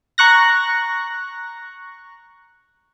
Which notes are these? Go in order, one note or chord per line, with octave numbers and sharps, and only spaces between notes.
A#5 C#6 F#6 A#6